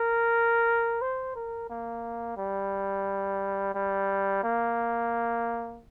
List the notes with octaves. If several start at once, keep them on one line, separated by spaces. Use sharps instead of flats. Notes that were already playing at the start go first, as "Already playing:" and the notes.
Already playing: A#4
C5
A#4
A#3
G3
G3
A#3